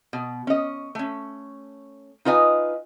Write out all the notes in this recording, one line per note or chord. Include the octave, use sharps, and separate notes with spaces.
B2
C#4 D#5
A3 C#4
D#4 F4 B4 D#5 G#5